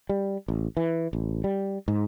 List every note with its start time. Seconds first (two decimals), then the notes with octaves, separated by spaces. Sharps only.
0.09 G3
0.48 A1
0.77 E3
1.13 A1
1.44 G3
1.88 G#2